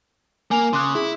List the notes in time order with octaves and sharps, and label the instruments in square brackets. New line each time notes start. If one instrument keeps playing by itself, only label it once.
[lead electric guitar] A#3 [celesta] G#5 F7
[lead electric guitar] C#3 [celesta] C6 D6 F#6
[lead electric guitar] E4 [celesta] G#4